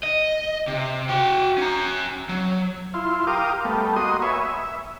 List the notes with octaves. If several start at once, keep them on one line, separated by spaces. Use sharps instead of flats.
D#5
C3
F#4 G5
C#4 A#5
F#3
E4 F4 C6
G4 A#4 F5 D6 D#6
G3 A3 B3
A#3 F#4 D#5 C6 D#6
B4 C#5 E5 G#5
E5